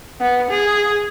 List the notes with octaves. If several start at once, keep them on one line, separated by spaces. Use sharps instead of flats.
B3
G#4